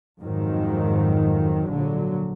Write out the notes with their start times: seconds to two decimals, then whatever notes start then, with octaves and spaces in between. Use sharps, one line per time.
0.20 F2 G#2 D#3 F#3
1.68 A#1 D3 F#3